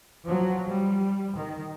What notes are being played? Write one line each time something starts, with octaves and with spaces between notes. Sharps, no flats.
F3 F#3
G3
D#3